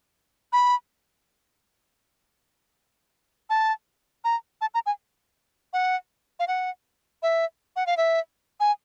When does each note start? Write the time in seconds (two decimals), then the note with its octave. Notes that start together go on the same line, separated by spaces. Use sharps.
0.53 B5
3.50 A5
4.24 A#5
4.61 A5
4.74 A#5
4.86 G#5
5.73 F#5
6.40 F5
6.48 F#5
7.23 E5
7.76 F#5
7.86 F5
7.97 E5
8.60 G#5